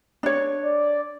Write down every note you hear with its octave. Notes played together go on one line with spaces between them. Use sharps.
D4 C#5
D5